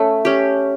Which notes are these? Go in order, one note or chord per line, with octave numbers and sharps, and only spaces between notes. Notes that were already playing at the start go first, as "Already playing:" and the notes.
Already playing: A3 C#4
C#4 G4